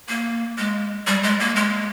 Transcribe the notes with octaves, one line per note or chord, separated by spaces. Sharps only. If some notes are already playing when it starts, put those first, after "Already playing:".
A#3
G#3
G3
G#3
A#3
G#3